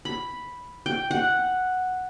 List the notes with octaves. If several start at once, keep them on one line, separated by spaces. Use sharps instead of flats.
B5
G5
F#5